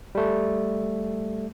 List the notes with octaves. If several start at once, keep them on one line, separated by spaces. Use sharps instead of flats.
G3 A3